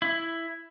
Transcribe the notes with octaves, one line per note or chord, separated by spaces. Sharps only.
E4